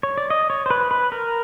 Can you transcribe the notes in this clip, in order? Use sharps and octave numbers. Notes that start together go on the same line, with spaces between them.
C#5
D5
D#5
C#5
C5
B4
B4
A#4